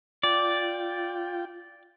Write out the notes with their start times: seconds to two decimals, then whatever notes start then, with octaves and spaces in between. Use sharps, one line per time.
0.23 F4 D5 G5